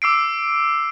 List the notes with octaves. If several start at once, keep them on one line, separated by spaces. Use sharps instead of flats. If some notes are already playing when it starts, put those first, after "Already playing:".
D6 E6 C7 D7